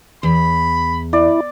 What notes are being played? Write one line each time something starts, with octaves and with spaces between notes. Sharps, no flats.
E2 B5
E4 D5